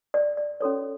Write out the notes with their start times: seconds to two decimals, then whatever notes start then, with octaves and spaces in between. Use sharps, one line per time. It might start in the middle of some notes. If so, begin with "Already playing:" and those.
0.14 D5
0.37 D5
0.61 C#4 F#4 A4 C#5